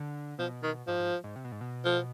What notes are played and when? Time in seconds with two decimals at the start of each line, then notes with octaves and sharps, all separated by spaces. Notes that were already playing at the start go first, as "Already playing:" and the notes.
Already playing: D3
0.39 B2 F3
0.63 D#3
0.87 G#2 F3
1.00 G#2
1.24 G#2
1.36 C3
1.44 B2
1.52 G#2
1.61 B2
1.85 F3